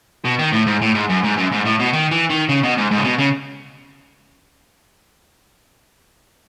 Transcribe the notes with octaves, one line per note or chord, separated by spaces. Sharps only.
B2
D#3
A2
G#2
A2
G#2
F#2
G#2
F#2
G#2
A2
B2
D#3
E3
D#3
C#3
B2
G#2
G#2
C#3
B2
C#3